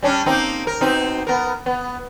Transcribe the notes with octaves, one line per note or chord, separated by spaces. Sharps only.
G3 C#4 D4
A#3 C4 D#4
A#4
B2 C4 D#4
B3 A#4
B3